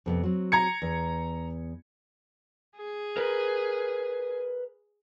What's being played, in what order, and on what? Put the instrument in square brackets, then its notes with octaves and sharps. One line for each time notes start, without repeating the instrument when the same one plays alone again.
[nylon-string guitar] F2 C3 B3
F#3 C4
[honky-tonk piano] A#5 G#6 C#7
[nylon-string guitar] E2
[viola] G#4
[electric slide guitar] A#4 B4